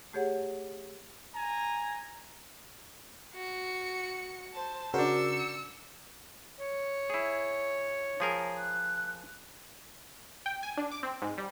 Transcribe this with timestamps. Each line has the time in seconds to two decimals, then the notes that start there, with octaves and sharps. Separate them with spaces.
0.13 A3 G4 G#4 C#5 F#5
1.35 G#5 A#5
3.35 F#4 C#7
4.54 C5 A5
4.94 C#3 D4 F#4 A#4 C5 E6 C#7
6.58 C#5
7.10 E4 G#4
8.20 F3 G#4 A#4
8.57 F#6
10.46 G5
10.63 G#5
10.77 D4
10.91 D6
11.03 C4
11.22 G#2
11.38 G3